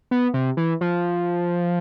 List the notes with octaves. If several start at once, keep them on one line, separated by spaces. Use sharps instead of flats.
B3
C3
E3
F3